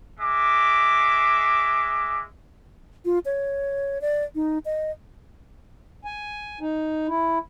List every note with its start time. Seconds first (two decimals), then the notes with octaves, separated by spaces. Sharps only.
0.19 G#3 E5 D6
3.05 F4
3.25 C#5
4.01 D5
4.35 D#4
4.65 D#5
6.05 G#5
6.61 D#4
7.08 E4